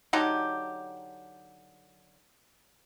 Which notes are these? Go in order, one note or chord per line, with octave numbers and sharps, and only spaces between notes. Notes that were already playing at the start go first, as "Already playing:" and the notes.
D3 F#3 D#4 G4